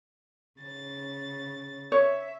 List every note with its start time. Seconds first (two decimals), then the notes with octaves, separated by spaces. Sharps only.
0.60 C#3 A6
1.92 C#5 E5